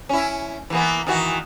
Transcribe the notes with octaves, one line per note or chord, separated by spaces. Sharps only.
C#4 E4
E3 A#3 B3
D#3 E3 F#4